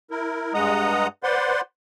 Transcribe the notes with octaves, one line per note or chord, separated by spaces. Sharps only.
E4 A#4
G2 G#3 D#5 F#5 A#5 D#6
B4 C5 D5 F#5 C6